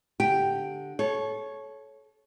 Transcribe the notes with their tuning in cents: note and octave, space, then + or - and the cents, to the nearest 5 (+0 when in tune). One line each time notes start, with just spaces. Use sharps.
D3 +0 G4 +0 G5 +0
A4 -30 C#5 -5